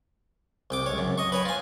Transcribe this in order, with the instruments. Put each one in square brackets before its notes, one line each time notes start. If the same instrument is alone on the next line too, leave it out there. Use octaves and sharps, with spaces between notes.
[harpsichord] C2 G5 D6
C#2 C#5
F#2
D#5 C#6
B4 C#5 G5
F4 G#5